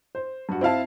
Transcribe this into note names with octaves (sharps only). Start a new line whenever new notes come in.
C5
G2 F#4
C4 E4 F5 A5